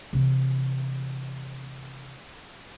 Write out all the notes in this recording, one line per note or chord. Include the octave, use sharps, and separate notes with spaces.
C3 E3